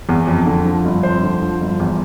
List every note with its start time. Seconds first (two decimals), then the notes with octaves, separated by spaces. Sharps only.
0.09 E2
0.27 F2
0.46 D3
0.66 F3
0.85 G1
1.03 F2 C5
1.23 D3
1.42 F3
1.62 G1
1.80 E2